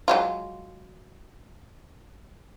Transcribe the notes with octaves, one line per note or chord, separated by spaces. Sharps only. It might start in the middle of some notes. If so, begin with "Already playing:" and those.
F#3 G#3 F4